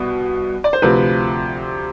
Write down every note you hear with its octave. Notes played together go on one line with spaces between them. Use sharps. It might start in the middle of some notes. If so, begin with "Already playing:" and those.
Already playing: C2 B2 B3
D5
C5
D2 C3 F3 C4 B4